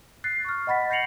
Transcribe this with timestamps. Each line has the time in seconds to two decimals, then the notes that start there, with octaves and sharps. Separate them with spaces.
0.24 F#6 A6 C7
0.45 C#6 F6
0.67 D#5 F#5 B5 A6 B6
0.90 G6 A#6 C7 C#7 F7 F#7